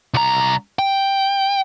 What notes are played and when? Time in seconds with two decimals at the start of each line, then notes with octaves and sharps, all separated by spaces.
0.14 C2 A#5
0.79 G5